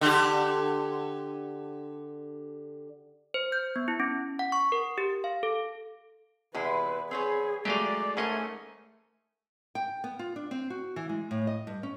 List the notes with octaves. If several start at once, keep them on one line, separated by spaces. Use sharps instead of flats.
D3 G4
C5
G6
B3
E4
C#4
F#5
C#6
A#4
G4
F5
A4
E2 C3 G#3 E4 B4
C4 G#4 B4 C#5
F#3 G#3 A3 G4 D5 D#5 F5
G#2 A3 C#4 G#4 A#4 D#5 G#5
G5
B3
F4
D4
C4
F#4
E3
G#3
A2
D#5
G2
C#4